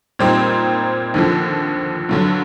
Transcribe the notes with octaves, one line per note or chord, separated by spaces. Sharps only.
A#2 G3 C4 D#4
D#2 D3 F3
G2 D3 F#3